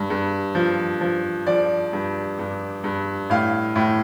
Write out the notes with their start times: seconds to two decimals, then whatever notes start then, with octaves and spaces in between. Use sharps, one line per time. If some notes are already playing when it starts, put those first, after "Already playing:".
Already playing: G2
0.10 G2
0.55 F3
1.01 F3
1.47 F3 D5
1.93 G2
2.39 G2
2.84 G2
3.30 A2 F5
3.76 A2